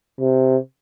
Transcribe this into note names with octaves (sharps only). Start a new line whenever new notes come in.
C3